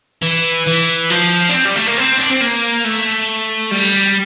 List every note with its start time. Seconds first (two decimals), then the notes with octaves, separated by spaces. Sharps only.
0.22 E3
0.66 E3
1.10 F3
1.49 D4
1.54 C4
1.65 G3
1.76 A3
1.87 A#3
1.98 C4
2.18 D4
2.30 C4
2.41 A#3
2.84 A3
3.72 G3